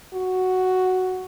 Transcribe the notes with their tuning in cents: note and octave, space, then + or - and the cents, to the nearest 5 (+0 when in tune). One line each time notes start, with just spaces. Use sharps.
F#4 +5